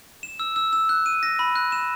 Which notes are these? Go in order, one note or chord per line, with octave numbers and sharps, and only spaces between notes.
E7
E6
E6
E6
F#6
D#7
A#6
B5
F#6
E7